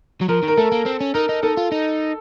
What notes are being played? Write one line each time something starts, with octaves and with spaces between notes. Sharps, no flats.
F#3
F3 A#4
D#3 A#4
A3 A4
A#3
C4
C#4
D#4 A#4
D#4
D#4 A4
F4
D#4